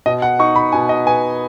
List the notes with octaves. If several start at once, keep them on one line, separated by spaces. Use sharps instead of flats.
B2 D#5
F#5
D#4 C#6
B5
B2 G#5
D#5
B3 G#5